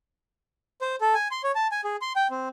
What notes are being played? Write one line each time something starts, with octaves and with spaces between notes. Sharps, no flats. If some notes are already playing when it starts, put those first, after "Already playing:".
C5
A4
G#5
C6
C#5
A5
G#5
G#4
C6
G5
C4